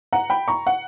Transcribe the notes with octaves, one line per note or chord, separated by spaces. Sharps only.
F#5 A#5
G5 B5
A#5 C#6
F#5